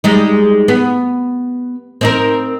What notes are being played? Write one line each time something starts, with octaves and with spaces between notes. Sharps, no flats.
G3 G#3 D#4
B3
C4 D#4 A#4